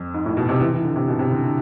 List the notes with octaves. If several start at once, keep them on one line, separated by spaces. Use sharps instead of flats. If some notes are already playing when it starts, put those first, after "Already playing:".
Already playing: F2
G#2
A2
B2
C3
E3
E3
D3
C3
B2
C3
D3
D3